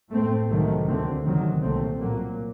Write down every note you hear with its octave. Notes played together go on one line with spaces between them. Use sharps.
A2 A3 C4
C2 C3 D#3 F#3 A3
D2 D3 A3 C4
D2 C3 D#3 F#3
C2 A#2 A3 C4
A#2 F#3 A#3